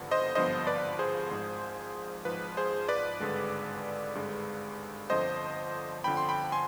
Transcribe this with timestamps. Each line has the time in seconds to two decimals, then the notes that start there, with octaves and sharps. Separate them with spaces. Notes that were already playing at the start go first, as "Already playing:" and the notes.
Already playing: G#1 G2 D3 F3 B3
0.11 C5 D#5
0.35 G#1 G2 D3 F3 B3 C5 D#5
0.67 B4 D5
0.99 G#4 C5
1.31 G#1 G#2 F3
2.25 G#1 G#2 F3 B4
2.57 G#4 C5
2.88 B4 D5
3.20 G#1 G2 D3 G#3
4.15 G#1 G2 D3 G#3
5.10 G1 F2 D3 F3 C5 D#5
6.04 G1 F2 D3 F3 G5 B5
6.17 C6
6.29 G5 B5
6.52 G#5 C6